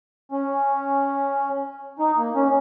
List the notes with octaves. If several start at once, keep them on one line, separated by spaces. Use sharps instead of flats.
C#4
D#4
A#3
C#4